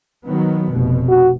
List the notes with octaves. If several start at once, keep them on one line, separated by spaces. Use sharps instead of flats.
D#3 F#3 B3
F1 B2
F#4